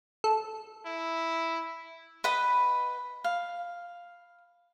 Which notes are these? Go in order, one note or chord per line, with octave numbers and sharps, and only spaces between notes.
A4
E4
B4 D#5 F#5 B5
F5